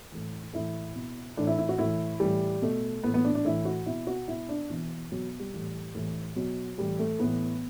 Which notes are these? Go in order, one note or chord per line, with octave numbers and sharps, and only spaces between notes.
A2 E3
A2 E3 E4
B2
A2 E3 D4
E4
E4
F#4
A2 E3 E4
A2 E3 G3
B2 A3
A2 E3 B3
B3
D4
D4
A2 E3 E4
F#4
B2 E4
F#4
B2 E4
D4
B2 E3
B2 F#3
G3
A2 E3
A2 E3
B2 F#3
A2 E3 G3
A3
A2 E3 B3